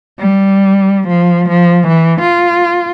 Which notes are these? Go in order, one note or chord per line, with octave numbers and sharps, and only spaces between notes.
G3
F3
F3
E3
F4